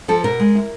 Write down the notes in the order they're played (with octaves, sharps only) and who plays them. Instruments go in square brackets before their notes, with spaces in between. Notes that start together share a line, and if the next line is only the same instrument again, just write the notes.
[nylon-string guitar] F3 A4
B2 A#4
G#3
E4